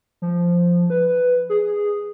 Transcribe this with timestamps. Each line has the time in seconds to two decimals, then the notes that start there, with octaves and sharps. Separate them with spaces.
0.22 F3
0.90 B4
1.49 G#4